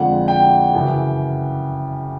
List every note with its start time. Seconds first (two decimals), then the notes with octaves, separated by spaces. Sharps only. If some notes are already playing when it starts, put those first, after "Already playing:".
Already playing: F2 D3 F3 G#3 F#5
0.28 G5
0.74 F#2 C#3 E3